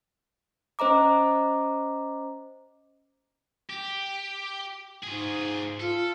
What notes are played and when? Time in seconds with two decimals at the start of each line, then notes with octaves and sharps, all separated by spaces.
0.79 C#4 C5 D#5 A#5 D6
3.69 G4
5.04 G#2 F4 G#4
5.80 F4 A4